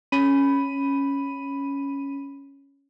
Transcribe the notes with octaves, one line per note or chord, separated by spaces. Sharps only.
C#4 B5 D#7